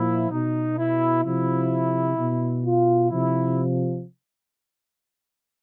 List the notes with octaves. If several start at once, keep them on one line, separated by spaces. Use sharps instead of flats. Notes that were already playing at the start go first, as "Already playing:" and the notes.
Already playing: A#2 F3 E4
B2 D#4
E4
C3 F3 E4
B2
F4
C3 F3 E4